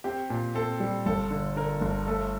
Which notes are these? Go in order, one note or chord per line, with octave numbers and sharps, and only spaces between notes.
C4 G4
A#2
C4 A4
G3
G1 A4
D3
D3 A#4
G1
A3 A4